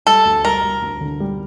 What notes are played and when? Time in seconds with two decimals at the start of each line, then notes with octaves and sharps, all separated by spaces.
0.07 G3 A4
0.25 D2
0.45 G3 A#4
0.63 G3
0.82 D2
1.01 D3
1.20 G3